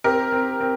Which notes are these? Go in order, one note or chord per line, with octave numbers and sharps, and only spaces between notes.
C4 G4 A#4
C4
C4